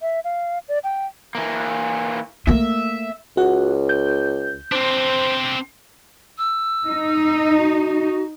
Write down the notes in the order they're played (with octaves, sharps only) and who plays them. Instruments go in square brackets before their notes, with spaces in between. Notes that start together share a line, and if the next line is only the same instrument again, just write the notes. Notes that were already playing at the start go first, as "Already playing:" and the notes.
[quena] E5
F5
D5
G5
[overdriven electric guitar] E3 A#3
[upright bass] A3 A#3 [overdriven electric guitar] E5
[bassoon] C#2 [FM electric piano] F#4 F#5
[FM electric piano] G6
[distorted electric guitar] C4 D4 [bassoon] C5
[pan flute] E6
[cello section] D#4
[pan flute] F#4